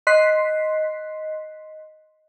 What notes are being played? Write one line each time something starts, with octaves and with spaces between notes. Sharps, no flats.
D#5 C6 F#6 B6 C7